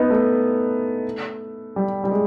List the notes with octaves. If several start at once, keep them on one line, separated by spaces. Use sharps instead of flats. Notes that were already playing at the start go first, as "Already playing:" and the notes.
Already playing: B3 D#4
A3
G3
G3
G#3